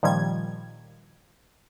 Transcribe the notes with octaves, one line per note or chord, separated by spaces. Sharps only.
A#2 D#3 F3 G3 G#6